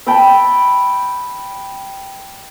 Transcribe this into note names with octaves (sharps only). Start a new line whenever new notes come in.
G5 A5 B5 E6